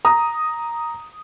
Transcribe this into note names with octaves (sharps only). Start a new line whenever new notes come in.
A#5 D#6